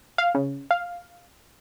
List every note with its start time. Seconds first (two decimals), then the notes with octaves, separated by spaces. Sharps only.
0.18 F5
0.35 C#3
0.71 F5